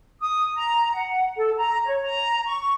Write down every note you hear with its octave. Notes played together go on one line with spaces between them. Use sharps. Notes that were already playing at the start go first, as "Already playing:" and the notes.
D#6
A#5
F#5
A4
A#5
C#5
A#5
C#6